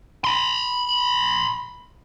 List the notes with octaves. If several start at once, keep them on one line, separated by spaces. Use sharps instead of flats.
B5 C6